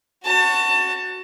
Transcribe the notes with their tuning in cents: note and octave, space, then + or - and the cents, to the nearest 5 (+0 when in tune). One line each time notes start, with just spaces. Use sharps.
F#4 +0 A5 +25